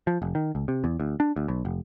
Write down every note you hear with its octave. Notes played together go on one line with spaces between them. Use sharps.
F3
F1
D#3
C#2
C3
E2
D2
D4
D2
B1
F1